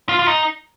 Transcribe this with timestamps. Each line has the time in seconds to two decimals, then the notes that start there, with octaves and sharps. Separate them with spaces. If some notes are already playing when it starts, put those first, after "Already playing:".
0.09 F4
0.19 F4
0.28 D#4